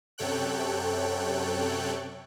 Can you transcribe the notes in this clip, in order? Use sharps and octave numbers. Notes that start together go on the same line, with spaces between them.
F#2 C3 A4 C#5 G5 F#6